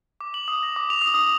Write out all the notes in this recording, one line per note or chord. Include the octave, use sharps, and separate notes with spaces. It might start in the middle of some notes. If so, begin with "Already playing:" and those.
D6
F#7
D#6
A#6
D6
F7
D#6
D#6